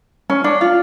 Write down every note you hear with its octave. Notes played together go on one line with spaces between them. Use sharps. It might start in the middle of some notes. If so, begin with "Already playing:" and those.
C#4
D4
F4